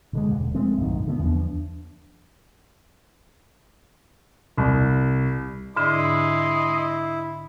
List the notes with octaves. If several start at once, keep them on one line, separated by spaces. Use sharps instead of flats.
B2 D3 G#3
D#1 F2
F3 G#3 A3 C4
B1 F#2 A2 D#3
D3 A3 B3
E2 F3 D4
C2
G#2 D3 D4 E4 D#5 C6 D#6